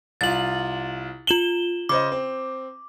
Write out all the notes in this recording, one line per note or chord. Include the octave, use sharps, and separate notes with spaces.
C2 F4 A6 F#7
F4 E7 F#7 G7
C#3 C5 D#5 D6
C4